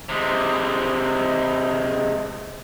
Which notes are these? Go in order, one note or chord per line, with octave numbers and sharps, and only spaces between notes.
C3 G#3